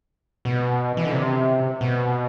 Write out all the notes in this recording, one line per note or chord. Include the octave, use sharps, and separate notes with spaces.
B2
E3
D3
C3
B2